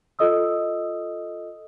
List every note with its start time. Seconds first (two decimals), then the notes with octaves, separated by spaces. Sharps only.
0.19 F4 A4 D#5 D#6 E6